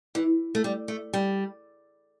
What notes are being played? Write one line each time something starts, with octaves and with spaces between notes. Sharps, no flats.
E3
A3
G3
A3
G3